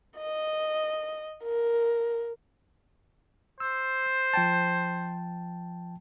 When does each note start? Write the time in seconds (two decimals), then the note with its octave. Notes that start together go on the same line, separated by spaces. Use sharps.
0.19 D#5
1.44 A#4
3.60 C5 E6
4.34 F3 G5 A5